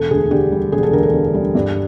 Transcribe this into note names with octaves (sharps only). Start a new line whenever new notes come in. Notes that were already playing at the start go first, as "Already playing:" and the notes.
Already playing: E1 A4
D2 G#4
D3 G4
G3
E1 G#4
A4
D2 A#4
A4
D3
G3
G2